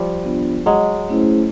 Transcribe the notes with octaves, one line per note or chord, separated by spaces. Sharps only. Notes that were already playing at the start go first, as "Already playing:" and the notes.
Already playing: F3 G3
B3 D4 F4
F#3 G#3
A3 C#4 E4 G#4 C5